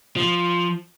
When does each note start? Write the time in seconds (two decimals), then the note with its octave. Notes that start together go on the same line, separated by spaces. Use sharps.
0.17 F3